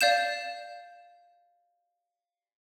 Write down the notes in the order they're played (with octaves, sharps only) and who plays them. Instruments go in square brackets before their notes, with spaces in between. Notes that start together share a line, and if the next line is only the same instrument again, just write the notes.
[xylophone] D5 F5 G6 E7